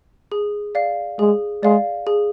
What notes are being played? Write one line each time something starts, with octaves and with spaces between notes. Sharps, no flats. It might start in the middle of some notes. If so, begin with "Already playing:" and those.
G#4
D5 F5
G#3 G#4
G#3 D5 F5
G#4